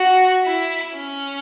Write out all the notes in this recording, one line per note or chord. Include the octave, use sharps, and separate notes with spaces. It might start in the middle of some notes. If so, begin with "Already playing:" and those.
Already playing: F#4
E4
C#4